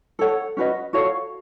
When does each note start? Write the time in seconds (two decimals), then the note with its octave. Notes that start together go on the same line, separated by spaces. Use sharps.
0.19 A4 C#5 F#5
0.57 C#4 F#4 B4 D#5
0.93 F#4 A4 C#5 F5